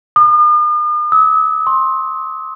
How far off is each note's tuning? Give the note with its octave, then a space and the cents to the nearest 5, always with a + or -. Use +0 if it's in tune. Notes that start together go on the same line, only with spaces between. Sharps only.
D#6 -45
E6 -45
C6 +20